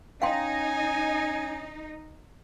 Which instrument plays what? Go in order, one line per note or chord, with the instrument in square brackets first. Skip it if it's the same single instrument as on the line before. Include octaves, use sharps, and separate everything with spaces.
[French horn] C#4 [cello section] D#4 [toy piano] F5 G5 C6 [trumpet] G#5